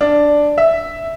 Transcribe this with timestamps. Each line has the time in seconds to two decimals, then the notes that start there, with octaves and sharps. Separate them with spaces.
0.01 D4
0.58 E5